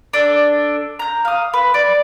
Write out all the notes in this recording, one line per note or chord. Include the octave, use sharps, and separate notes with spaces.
D4 A4
A#5 G6
F5 D#6
B4
D5